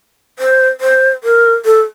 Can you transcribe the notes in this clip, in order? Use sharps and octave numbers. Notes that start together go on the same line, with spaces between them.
C5
C5
A#4
A4